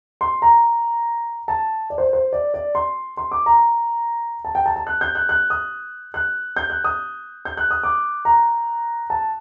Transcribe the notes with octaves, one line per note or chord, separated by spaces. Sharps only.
C6
A#5
A5
D5
C5
C5
D5
D5
C6
C6
D6
A#5
A5
G5
A5
A5
F#6
G6
F#6
F#6
D#6
F#6
G6
F#6
D#6
G6
F#6
D#6
D6
A#5
A5